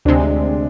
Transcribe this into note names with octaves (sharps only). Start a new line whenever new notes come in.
D2 C3 G#3 D4